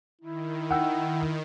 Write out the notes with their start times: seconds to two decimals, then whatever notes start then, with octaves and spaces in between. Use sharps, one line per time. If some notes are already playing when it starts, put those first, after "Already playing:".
0.21 D#3 E4
0.71 F#5 G5 E6